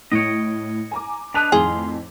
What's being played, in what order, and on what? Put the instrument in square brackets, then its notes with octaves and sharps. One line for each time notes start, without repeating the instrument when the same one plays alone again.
[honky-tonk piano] A2 D7 [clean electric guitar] C#5 D#5
[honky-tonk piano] G#5 A#5 D6
[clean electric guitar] D4 B4 D#5 [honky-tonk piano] A5 F7
[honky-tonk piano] F2 A2 D#3 [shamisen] G#4 [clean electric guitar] F5 C6